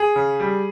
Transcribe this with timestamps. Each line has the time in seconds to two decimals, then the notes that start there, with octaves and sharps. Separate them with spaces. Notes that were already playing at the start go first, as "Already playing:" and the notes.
Already playing: G#4
0.16 C#3
0.40 G3